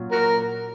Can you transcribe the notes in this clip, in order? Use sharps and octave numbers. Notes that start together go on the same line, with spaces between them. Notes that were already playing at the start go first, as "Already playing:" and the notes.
Already playing: A#2 F#3 C#4
F#4 A#4